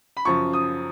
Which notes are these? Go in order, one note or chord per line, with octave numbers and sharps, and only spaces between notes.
B5
F#2 C#3 F3 C#6
D#6